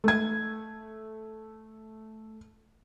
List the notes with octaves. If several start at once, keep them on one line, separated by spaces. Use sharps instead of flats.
A3 G#6